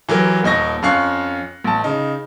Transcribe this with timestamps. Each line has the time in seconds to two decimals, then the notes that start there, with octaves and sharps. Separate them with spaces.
0.09 E3 F#3 G4 A#4
0.43 D#1 D#2 D#4 C#6 A#6
0.82 F2 C#4 F5 C#6 F#6 C7
1.64 A1 A5
1.84 C#3 D#4